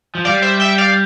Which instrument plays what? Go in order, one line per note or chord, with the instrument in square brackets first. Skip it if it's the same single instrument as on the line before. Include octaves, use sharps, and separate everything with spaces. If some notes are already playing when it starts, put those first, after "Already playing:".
[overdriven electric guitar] F3
[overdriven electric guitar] G3 [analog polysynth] D5 F5
[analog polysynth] C5 E5
E5 G5
D5 F5